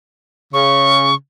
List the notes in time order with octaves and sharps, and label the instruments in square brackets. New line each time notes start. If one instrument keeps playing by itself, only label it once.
[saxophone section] C#3 [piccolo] C#6